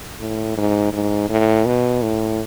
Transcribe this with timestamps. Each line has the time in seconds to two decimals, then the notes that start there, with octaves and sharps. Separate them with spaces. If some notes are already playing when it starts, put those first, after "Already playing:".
0.21 A2
0.57 G#2
0.93 G#2
1.30 A2
1.66 B2
2.02 A2